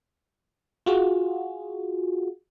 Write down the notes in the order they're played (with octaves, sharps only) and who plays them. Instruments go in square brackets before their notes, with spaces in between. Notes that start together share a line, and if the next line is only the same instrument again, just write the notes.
[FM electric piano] F4 F#4 G#4